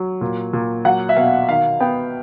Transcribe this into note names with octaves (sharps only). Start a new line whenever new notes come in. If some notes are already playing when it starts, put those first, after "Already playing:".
Already playing: F#3
A#2
A#2
F#3 F#5
E5
B2 F5
D#3 F5
B3 G5